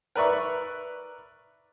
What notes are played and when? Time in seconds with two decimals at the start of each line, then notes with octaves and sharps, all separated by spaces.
0.15 A#4 B4 D5 E5 C#6